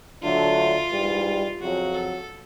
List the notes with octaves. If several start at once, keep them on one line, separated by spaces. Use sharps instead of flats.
D3 F#3 A3 D4 F4
G#2 E3 G3
F2 C#3 F#3 F#4
A4